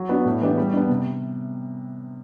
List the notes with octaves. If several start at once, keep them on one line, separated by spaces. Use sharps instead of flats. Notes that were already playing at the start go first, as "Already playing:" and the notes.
Already playing: F#3
B3 D4 F#4
A2
E3 B3 D4 G4
G3
B3 D4
C3